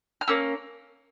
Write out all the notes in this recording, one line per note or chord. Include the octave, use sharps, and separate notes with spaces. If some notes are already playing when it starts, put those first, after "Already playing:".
F6
A#3 C#4 E6